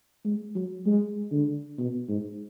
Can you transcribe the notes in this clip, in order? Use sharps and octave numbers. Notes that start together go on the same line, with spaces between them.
G#3
F#3
G#3
D3
B2
G#2